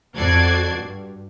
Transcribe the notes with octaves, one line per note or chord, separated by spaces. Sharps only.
F2 F#4 A4 D5 G#6 C7
G2